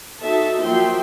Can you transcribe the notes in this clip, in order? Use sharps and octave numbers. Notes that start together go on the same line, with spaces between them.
D#4 F#4 A4 E5 A5
F3 F#3 A#3 E5 G5 C6